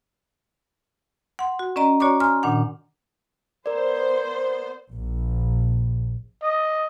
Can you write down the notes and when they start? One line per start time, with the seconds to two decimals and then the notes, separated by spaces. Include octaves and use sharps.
1.39 F#5 C6
1.59 F#4
1.76 C#4 D5 D#5 A#5
2.00 F#4 C#5 D5 A#5 C#6 D6
2.20 G#5 A#5 C6 F6
2.43 A#2 D#3 D4 F#5
3.66 B3 A#4 C5 D5
4.93 A#1
6.42 D#5